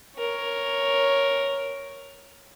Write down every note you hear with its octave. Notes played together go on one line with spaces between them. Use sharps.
A#4 C#5